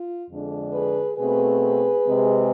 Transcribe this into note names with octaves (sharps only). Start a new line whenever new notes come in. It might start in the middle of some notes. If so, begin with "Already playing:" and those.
Already playing: F4
F2 D3 G#3 D4
G#4 B4
B2 A3 C4 G#4 B4
C3 G#3 C4